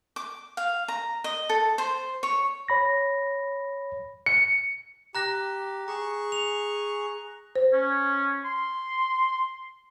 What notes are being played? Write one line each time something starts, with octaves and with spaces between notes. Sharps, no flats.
D6
F5
A#5
D#5
A4
C5
C#5
C#5 B5 A#6
C#7
G4 A#5 F#6 A#6
G#4 A#5 C#6
F7
C5
C#4
C6